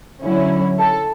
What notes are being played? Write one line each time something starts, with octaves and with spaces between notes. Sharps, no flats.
D3 F#3 C#4 E4
A4